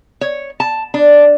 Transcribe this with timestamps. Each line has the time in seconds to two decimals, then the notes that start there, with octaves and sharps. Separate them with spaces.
0.21 C#5
0.60 A5
0.94 D4